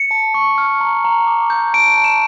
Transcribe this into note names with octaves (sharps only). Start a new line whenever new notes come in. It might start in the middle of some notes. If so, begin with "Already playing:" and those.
Already playing: C#7
A5
C#6
F6
A#5
A#5
D6
G6
A5 D7
A5
E7